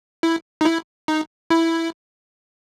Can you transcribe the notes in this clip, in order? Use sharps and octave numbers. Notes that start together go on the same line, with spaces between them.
E4
D#4
E4
D#4
E4